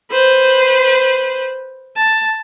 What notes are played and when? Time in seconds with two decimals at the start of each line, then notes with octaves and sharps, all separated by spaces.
0.11 B4 C5
1.97 A5